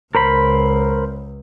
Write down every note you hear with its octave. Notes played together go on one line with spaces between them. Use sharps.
C#2 A#4 C5 B5